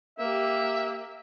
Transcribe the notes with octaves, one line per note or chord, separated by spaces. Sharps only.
A#3 G4 E5